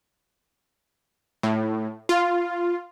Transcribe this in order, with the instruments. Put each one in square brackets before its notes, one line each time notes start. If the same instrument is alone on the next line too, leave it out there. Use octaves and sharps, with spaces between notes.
[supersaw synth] A2
F4